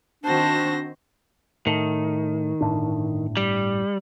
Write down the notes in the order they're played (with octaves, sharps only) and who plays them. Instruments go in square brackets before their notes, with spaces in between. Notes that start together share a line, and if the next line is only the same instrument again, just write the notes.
[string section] D#3 C4 F#4 [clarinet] D4 [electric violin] C5 A#6 [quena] A5
[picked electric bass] A2 [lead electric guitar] D#3
[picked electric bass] G1 A2 D4
[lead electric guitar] G3